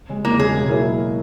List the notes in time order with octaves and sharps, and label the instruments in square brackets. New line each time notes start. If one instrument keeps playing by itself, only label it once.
[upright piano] C#3 G#3
[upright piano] E2 [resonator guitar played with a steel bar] A#3
[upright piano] C#3 G#3 [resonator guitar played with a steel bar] G#4
[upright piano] B2
F#3 A#3 E4 A#4